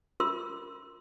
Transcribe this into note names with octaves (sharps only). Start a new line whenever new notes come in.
F4 A#4 C6 E6